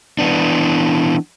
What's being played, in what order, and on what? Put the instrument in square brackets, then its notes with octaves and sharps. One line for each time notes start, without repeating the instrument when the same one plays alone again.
[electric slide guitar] E3 B3 D4